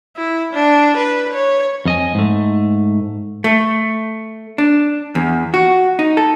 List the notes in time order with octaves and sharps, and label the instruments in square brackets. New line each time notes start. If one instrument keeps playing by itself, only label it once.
[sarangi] E4
D4
B4
C#5
[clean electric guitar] F2 D#5 G#5
G#2 A3
[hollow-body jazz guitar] A3
D4
E2
F#4
D#4
A4